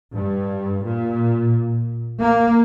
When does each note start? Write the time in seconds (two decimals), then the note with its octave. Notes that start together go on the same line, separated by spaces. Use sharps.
0.15 G2
0.83 A#2
2.20 A#3